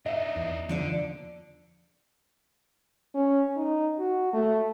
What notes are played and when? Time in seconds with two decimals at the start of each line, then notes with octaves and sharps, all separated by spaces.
0.06 D4 D#4 D#5 E5
0.36 E2
0.69 D#2 D3 F3 D4 D5
3.14 C#4
3.56 D#4
3.99 F#4
4.33 A3